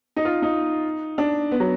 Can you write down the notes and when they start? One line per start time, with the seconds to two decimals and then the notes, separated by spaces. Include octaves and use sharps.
0.16 D#4
0.25 F4
0.42 D#4
1.18 D4
1.51 B3
1.60 F#3